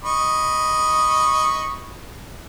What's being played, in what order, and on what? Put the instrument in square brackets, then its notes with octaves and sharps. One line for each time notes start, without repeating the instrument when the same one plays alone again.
[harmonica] D#5 B5 C#6